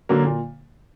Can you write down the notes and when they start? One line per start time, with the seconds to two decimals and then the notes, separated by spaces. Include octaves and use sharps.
0.09 D3 F#3 A#3
0.25 A#2